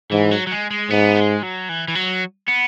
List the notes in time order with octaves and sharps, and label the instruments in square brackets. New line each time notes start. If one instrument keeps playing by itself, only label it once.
[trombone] G#2 [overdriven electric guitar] E3
[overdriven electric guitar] F#3
F#3
G#3
G#3
[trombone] G#2 [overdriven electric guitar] B3
[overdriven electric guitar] G#3
F#3
E3
E3
F#3
B3